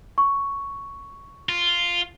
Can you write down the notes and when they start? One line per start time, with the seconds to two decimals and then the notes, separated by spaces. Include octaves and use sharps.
0.18 C#6
1.49 F4